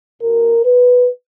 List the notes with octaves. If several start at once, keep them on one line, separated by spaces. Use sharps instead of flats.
B2 A#4
B4